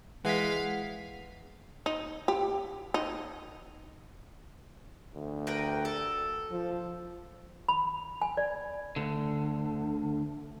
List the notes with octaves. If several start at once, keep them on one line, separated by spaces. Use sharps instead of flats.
E3 G#3 F5 F#5 B6
D#4
G4
D#4
D2
A#4 B4 G5
A4
F3
B5
G#5
D5
D2 D3